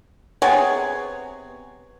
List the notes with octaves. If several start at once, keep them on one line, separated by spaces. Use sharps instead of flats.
C3 B3 G#4 C#5